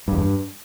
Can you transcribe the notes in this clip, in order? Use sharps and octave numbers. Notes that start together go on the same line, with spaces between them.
G2
E2
G2